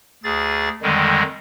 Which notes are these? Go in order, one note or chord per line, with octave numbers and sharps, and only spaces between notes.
D2 G#4 A6
F2 D3 D#3 G3 G#3